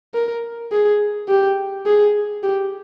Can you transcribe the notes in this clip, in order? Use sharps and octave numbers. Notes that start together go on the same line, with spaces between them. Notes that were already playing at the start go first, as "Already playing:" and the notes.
A#4
G#4
G4
G#4
G4